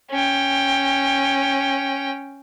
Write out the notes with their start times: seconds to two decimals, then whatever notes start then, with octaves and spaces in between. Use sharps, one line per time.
0.11 C#4 G5